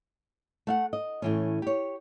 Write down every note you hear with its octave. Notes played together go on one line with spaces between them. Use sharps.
A3 F5 F#5
D#5
A2 E3 C#4
G4 C#5